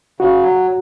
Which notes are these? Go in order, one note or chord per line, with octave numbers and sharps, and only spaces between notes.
C#3 F#4
F#3